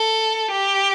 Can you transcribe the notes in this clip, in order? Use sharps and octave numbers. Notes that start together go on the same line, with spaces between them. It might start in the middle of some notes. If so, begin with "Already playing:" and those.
Already playing: A4
G4